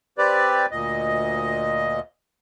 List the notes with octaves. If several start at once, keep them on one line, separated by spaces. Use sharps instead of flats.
C4 G4 B4 D5
D2 A#2 D#5